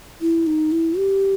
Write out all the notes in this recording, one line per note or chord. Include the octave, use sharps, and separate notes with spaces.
E4
D#4
E4
G4